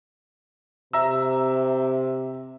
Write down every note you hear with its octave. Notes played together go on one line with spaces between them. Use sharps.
C3 E5 A#5 E6